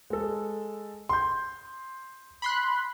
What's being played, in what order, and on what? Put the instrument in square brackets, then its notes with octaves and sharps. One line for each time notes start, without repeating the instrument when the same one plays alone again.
[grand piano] G#3 A4
C6 G6
[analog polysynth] B5 C6 F#6